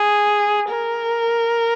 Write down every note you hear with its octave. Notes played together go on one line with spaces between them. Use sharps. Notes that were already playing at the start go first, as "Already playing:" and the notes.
Already playing: G#4
A#4